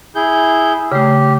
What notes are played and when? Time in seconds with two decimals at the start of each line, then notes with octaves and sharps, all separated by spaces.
0.15 E4 G#4 G6
0.92 C#3 A3 G4